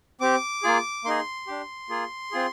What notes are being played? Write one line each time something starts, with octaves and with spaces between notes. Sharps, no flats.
C4 G4 D6
A#3 F4 G#4
A#3 D#4 G#4 C6
D4 G4
A#3 F4 G#4
C4 F4 G#4